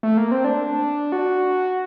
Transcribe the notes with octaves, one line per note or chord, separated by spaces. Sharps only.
A3
A#3
C4
D4
F#4